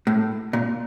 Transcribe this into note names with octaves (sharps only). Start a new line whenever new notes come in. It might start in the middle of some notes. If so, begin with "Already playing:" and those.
A2
A#2